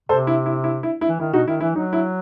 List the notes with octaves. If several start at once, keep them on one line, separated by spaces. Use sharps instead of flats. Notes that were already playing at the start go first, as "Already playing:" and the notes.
C3 A4 C5
E4
E4
E4
E4
E4
E3
D#3 E4
B2 D#4 F#4
D#3 E4
E3 E4
F#3 D#4
E4